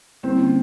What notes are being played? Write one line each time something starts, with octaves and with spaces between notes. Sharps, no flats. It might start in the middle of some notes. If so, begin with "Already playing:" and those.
D3 G3 A#3 C4 C#4 E4